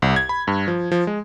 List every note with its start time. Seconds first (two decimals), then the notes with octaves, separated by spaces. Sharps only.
0.02 C2
0.16 G#6
0.29 B5
0.47 G2
0.68 F3
0.92 F3
1.07 G#3